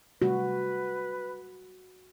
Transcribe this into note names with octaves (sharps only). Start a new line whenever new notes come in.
C3 G3 A3 F#4 B4